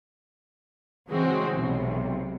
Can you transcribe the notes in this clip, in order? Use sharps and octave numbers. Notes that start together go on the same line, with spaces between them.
C#3 E3 F#3 G#3 C4 F#4
B1 C3